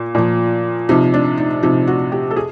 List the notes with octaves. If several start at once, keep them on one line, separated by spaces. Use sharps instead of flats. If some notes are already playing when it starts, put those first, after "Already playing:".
Already playing: A#2
A#2 F3
C3 F3 D#4
D4
D#4
C3 F3 D#4
F#4
G4
A4
G#4